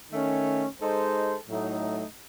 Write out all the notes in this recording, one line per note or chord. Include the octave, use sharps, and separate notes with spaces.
D#3 A3 C#4
G#3 D#4 A4 C5
A2 F#3 A3 D#4